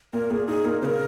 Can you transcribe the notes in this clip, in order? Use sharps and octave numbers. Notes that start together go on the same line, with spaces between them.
A#2 A#4
A#2 G#4
D#4 G#4
A#2 A#4
C#3 A#4 C5